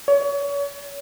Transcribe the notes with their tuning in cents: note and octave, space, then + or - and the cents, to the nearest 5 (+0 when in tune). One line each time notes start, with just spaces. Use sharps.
C#5 +35